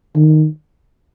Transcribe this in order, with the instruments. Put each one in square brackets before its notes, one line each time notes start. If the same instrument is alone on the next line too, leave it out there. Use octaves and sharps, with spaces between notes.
[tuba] D#3